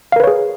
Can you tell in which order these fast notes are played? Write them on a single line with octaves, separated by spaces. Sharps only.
F5 A#4 B4 C#5 G#4